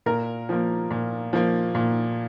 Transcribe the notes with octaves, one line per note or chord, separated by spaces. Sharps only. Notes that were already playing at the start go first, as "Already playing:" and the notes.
A#2 A#4
F3 A#3
A#2
F3 A#3
A#2